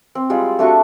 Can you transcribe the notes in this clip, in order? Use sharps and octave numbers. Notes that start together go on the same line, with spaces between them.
C4
G3 G#3 F4
A3 D4 F#4 C#6